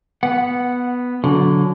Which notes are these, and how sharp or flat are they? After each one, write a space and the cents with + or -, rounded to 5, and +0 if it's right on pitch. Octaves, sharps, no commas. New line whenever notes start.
B3 +0 F#5 -5
D3 -30 F#3 -20